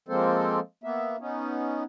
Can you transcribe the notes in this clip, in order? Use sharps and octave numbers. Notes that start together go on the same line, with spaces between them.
F3 G#3 A#3 C4 A4 C5
A#3 B3 E5
B3 C#4 D#4